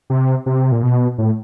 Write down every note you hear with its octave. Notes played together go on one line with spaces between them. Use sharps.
C3
C3
A#2
B2
A2